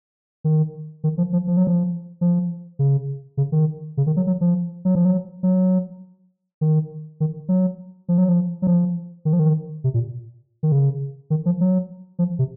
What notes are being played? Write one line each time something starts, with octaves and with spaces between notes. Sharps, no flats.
D#3
D#3
F3
F3
F3
F#3
F3
F3
C#3
C#3
D#3
C#3
D#3
F#3
F#3
F3
F#3
F3
F#3
F#3
D#3
D#3
F#3
F3
F#3
F3
F#3
F3
D#3
F3
D#3
C3
A#2
D#3
C#3
D#3
F3
F#3
F3
C3